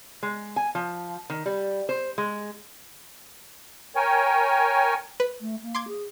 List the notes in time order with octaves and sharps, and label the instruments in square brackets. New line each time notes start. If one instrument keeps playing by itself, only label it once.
[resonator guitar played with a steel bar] G#3
G#5
F3
D#3
G3
C5
G#3
[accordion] A#4 C#5 G5 G#5
[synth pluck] B4
[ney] A3
A#3
[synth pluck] C6 D6 G#6
[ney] G#4